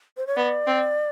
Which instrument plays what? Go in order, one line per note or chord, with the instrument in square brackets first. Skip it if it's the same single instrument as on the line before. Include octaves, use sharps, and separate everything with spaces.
[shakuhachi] C5
C#5
[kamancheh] B3 [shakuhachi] D5
[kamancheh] C4